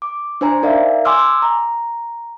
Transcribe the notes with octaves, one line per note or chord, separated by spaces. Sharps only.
D6
D4 C5 G#5 A#5
D#4 A#4 D5 E5 F5
G#5 C6 D6 E6 F6
A#5